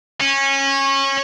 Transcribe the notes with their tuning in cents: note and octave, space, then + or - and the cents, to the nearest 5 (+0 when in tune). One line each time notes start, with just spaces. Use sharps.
C#4 -20